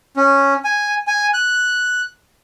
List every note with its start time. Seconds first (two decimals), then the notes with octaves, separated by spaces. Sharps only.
0.17 C#4
0.64 G#5
1.07 G#5
1.34 F#6